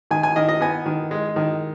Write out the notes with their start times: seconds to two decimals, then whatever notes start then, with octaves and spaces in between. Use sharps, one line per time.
0.11 D#3 G#5
0.23 G#5
0.36 D#3 D#5
0.49 D#5
0.61 B3 G#5
0.86 D#3
1.11 G#3
1.36 D#3